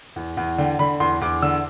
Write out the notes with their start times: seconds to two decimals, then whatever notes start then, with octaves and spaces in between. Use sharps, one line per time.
0.16 E2
0.37 E2
0.58 D3 G5
0.79 D3 B5
1.00 E2 C6
1.21 E2 D6
1.42 D3 E6